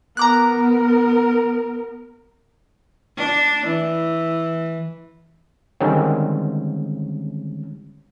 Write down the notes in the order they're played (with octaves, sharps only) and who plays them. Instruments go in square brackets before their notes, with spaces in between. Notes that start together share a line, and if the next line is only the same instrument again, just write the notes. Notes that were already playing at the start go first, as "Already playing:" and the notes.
[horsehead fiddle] B3 A#4 [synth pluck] A#5 D6 F#6
[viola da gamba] D4
E3
[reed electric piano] D3 D#3 G3 G#3 C4 C#4